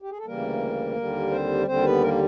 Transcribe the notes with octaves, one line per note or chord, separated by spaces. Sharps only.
G4
G#4
A4
D2 C#3 E3 G3 A#3 A#4
D#2 D3 G3
C4 C5
D#2 D3 G3 C4 C5
B3 B4
A#3 A#4